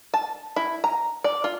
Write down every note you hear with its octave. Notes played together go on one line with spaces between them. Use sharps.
A5
E4
A#5
D5
F4